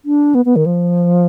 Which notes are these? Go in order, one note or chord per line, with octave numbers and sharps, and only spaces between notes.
D4
B3
B3
D#3
F3